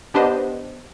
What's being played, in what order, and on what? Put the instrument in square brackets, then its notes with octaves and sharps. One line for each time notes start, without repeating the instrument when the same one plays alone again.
[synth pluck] B3 D4 G4 B4 C5 D#5